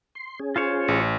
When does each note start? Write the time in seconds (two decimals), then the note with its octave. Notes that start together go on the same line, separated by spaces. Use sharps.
0.15 C6
0.40 C#4 G#4
0.56 F4 C5 C#5
0.88 A1